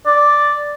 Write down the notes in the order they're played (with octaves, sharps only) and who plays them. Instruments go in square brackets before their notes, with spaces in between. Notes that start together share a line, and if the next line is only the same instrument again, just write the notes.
[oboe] D5